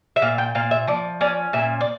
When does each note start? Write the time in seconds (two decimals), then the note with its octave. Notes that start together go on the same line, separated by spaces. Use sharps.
0.16 E5
0.22 A#2 F5
0.38 G5
0.55 A#2 F5
0.71 E5
0.87 F3 D5
1.21 C#4 D5
1.53 A#2 E5
1.81 D5